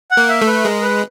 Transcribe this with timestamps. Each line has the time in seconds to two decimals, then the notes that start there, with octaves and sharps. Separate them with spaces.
0.11 F#5
0.17 A#3
0.29 E5
0.42 A3
0.47 B4
0.65 G#3 A#4
0.82 B4